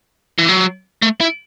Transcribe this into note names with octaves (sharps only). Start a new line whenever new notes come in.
E3
F#3
A3
E4